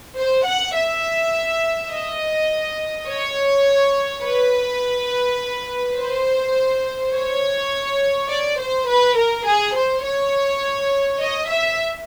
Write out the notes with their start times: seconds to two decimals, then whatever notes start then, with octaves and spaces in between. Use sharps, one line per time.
0.18 C5
0.46 F#5
0.76 E5
1.91 D#5
3.07 C#5
4.23 B4
5.97 C5
7.13 C#5
8.29 D5
8.59 C5
8.87 B4
9.17 A#4
9.46 G#4
9.75 C5
10.04 C#5
11.19 D#5
11.48 E5